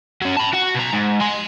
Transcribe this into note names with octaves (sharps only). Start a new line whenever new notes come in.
F#3 C#4
A5 B5
F#4 F#5
B2 A#5
G#2
G#5 C6